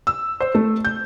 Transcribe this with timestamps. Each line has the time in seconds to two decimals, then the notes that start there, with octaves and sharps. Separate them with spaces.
0.07 E6
0.40 C5
0.55 A3
0.85 G6